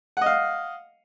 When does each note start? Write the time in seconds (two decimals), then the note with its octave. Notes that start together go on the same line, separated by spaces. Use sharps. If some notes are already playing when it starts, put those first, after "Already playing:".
0.17 F#5
0.21 D#5
0.26 F5